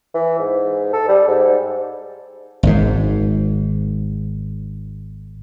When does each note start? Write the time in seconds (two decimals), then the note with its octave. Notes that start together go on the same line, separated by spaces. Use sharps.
0.14 E3
0.39 G#2
0.93 A4
1.08 G3
1.28 G#2
2.63 G#1 G#2